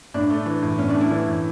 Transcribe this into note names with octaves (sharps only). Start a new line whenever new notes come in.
A2 D4
A3
E3
A2
A2 C#4
D4
A3
E4
E3
A2